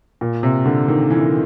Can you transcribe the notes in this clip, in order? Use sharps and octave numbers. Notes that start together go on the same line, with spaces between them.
A#2
C3
D3
D#3
E3